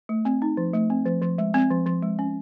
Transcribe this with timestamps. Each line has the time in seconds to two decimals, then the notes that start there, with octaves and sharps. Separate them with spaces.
0.09 A3
0.25 C4
0.42 D#4
0.57 F3
0.74 A3
0.90 C4
1.06 F3
1.22 F3
1.38 G#3
1.54 C4
1.70 F3
1.86 F3
2.03 G#3
2.19 C#4